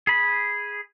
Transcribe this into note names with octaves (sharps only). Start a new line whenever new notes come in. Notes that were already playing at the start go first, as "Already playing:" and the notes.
G#4 B5